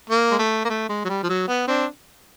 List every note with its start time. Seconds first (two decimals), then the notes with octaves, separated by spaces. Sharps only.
0.10 A#3
0.31 G#3
0.39 A3
0.65 A#3
0.69 A3
0.89 G#3
1.05 F#3
1.09 G3
1.23 F3
1.29 F#3
1.48 B3
1.68 C4 D4